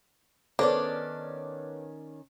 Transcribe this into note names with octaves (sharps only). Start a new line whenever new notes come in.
D#3 B3 C#4 D4 A4 C5 D5